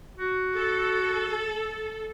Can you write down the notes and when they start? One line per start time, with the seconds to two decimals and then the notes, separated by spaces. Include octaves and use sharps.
0.17 F#4
0.55 A4